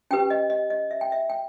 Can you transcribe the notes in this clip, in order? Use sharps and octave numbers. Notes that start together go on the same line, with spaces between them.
C#4 G4 B4 G5
D#5
D#5
D#5
E5
G5
E5
G5